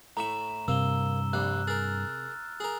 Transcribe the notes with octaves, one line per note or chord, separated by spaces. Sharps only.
A2 E5 A#5 C#6 E7
G2 C3 A#3 E6 E7 G7
A#1 G3 F#6
G#4 A#4 F6 A6
G#4 A#4